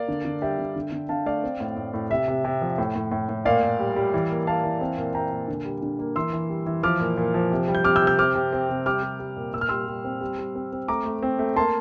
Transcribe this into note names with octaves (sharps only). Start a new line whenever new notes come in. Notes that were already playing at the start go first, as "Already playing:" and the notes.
Already playing: A#3 D5 F5
D3
D3
G3 E5 G5
D3
D3
D3
D3 F5 A5
A3 D5 F5
C4
A2
A2
A2
C3 E5
C3
C3
F3
A2
A2
A2
A2
A#2 D5 F5
A#2
G3
G3
E3
A#3
A#3 F5 A5
E3
C4
A#2
A#2 G5 A#5
A#2
D3
G3
D3
A#3
E3 C6 E6
E3
G3
E3
F3 D6 F6
A#2
A#2
F3
C3
G3
G6
C3 D6 F6
E6 G6
C3
E6 G6
C4 D6 F6
C3
C4
C3
G3 D6 F6
G3
G3
A#2
A#2 E6
F6
G3 C6 E6
G3
C4
G3
G3
C4
C4
A3 A#5 D6
A3
C4
A3
A#3 A5 C6